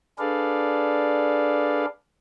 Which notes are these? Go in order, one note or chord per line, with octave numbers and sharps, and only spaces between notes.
D4 G#4 A4 B4 D5 F5